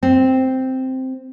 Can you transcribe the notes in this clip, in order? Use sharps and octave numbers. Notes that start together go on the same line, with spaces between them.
C4